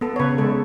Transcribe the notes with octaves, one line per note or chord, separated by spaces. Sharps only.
B3 A4
C#5
C#3 B4
G#3 A4